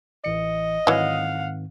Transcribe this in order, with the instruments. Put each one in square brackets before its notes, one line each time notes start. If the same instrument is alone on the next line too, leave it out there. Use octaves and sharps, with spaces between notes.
[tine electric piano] A1 E3 C#7 [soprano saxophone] D#5
[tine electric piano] G#2 D#3 C4 [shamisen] E3 F#3 [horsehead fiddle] F5 F#5